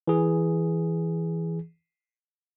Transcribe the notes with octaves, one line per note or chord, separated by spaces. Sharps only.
E3 G#4